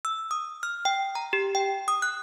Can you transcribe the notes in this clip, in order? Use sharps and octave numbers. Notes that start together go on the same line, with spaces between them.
E6
D#6
F6
G5
A#5
G4
G5
D#6
F#6